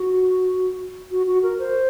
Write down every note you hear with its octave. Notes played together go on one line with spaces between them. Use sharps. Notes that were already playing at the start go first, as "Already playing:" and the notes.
Already playing: F#4
F#4
F#4
A#4
C5